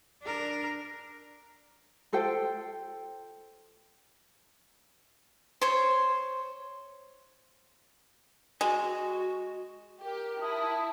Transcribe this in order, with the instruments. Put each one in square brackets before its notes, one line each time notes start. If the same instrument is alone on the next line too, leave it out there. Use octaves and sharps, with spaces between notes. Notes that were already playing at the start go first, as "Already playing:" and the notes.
[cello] D4 A#4
[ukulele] F4 A4 C5 G5
[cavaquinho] C5 C#5
[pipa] G#3 [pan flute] F#4
[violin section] G4 [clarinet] A#4
[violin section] E4 [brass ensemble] A5 [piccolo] D#6